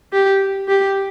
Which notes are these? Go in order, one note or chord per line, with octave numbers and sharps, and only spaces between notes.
G4
G4